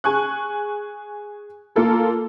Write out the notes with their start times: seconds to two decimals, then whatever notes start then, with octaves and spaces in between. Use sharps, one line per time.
0.04 G#4 G#5 C#6 F#6
1.76 A#3 F4 A4 A#4